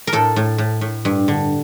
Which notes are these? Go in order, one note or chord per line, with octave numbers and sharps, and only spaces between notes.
A#4
A2 A4
A2
A2
A2
G2
D3